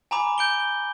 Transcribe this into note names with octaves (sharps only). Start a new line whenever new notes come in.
G#5 A#5 B5 D6
G6 D7 G7